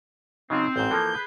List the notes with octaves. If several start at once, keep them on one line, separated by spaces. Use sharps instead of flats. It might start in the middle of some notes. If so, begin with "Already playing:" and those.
C#3 F#3 C4 D#4 F4
A1 G#2 G6
E3 F3 A#3 A4
G#4 B4